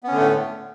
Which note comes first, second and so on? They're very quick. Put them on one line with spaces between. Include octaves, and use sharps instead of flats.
B3 C#4 D3 A3 A2